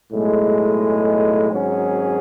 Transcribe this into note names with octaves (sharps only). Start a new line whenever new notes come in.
B1 A2 G#3
G#1 G#2 F#3 C#4 G#4